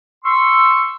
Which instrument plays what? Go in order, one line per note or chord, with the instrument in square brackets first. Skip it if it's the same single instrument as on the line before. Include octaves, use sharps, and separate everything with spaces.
[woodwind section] C6 C#6 E6